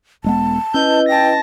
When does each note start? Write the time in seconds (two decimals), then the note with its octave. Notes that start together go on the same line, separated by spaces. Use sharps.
0.24 E1 G#3 B3 A5
0.74 C#4 E4 B4 D#5 G6
1.09 G5 A5 A#6